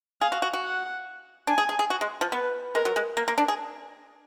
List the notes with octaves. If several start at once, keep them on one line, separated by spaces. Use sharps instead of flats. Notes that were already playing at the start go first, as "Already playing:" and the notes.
G#4 F5
F#4
F#4
F#4
F#5
D4 G#5
G#4
G#4
G#4
F#4
G#3
F3
B3 B4
G#3 A#4
F#3
G#3
A#3
A#3
D4
G#4